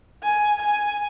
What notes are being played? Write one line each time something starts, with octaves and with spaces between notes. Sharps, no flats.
G#5
G#5